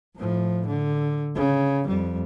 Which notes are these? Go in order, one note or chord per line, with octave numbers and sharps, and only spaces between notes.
A2 F3
D3
C#3
F2 G3